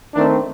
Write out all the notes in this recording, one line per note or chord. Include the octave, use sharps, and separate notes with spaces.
D#3 A3 C4 D4